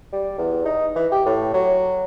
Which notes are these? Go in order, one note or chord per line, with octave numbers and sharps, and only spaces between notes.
G3
E2
D#4
E3
G4
A2
F#3